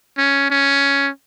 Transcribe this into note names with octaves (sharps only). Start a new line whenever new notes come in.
C#4
C#4